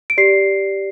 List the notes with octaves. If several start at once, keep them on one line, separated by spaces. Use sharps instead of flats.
D7
G4 D5 C7